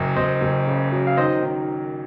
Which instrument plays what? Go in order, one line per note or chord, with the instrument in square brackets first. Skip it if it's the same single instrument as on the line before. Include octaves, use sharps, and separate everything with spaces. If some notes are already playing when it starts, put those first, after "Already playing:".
Already playing: [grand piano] F#1 F#2
[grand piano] F#1 [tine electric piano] C5 D#5
[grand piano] F#1
C#3
F#3
[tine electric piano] F5
[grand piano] D#3 [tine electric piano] C5 D#5
[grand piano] D#3